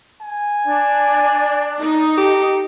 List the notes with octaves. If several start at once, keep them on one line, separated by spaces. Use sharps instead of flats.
G#5
D4 D5
D#4
G4 A4